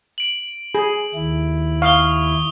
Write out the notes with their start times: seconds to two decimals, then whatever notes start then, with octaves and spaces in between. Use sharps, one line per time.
0.18 D7 F#7
0.75 G#4
1.15 D#2 E4
1.82 F5 C#6 D#6 G7